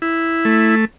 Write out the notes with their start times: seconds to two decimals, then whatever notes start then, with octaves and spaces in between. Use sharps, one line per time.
0.02 E4
0.45 A3